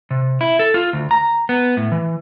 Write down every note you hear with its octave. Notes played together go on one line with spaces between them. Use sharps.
C3
E4
A4
F4
D2
A#5
B3
A2
E3